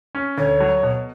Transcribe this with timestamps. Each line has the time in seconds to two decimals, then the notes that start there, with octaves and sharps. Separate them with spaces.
0.15 C#4
0.37 D2 C#5
0.60 F#3
0.83 B2